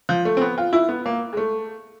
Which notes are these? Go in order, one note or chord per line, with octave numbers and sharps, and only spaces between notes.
F3
A3
C4
B3
F4
E4
B3
A#3
G#3
A3